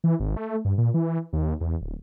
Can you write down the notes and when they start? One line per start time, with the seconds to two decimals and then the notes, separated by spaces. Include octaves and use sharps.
0.04 E3
0.20 G#1
0.37 A3
0.65 G2
0.78 A#2
0.94 E3
1.33 D#2
1.61 E2
1.82 D1